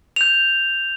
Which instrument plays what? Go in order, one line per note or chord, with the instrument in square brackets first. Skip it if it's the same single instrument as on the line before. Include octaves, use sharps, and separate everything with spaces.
[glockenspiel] G6 F7